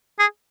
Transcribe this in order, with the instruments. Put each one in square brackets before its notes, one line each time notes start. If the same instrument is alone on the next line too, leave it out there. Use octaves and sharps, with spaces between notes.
[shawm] G#4